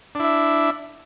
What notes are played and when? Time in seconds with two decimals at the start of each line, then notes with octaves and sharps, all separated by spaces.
0.15 D4
0.20 E4
0.24 E5